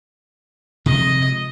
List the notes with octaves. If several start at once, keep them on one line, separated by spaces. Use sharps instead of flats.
C3 F3 G#3 D#5